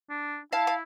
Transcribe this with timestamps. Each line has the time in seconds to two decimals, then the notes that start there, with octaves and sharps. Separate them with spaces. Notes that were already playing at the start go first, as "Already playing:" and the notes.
0.10 D4
0.52 E4 F5 A5
0.67 F5